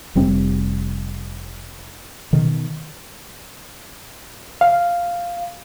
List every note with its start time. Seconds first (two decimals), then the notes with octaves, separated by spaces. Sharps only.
0.15 F1 G3 C4
2.33 B2 D#3
4.61 F5